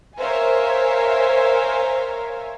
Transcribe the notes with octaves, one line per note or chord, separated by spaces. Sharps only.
A#4 C5 C#5 E5 F5 G#5